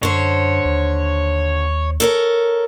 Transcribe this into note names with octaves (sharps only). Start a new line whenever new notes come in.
F#2 D3 C5 C#5
D#2
A4 A#4 C#5